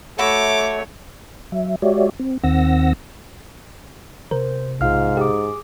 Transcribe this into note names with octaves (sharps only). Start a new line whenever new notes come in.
A3 F#4 C#5 E5 B5 D6
F#3 E5
G#3 F#4 G4 C#5 D5 E5
C4
D#2 D#3 C4 F#5 E6 A#6
C3 A#4 C5
B1 G#2 F4 F5 F6
G4 G#4 D6